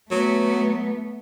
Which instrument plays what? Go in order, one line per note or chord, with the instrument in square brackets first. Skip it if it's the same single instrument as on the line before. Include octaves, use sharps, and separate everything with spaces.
[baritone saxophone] F#3 [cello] A3 B3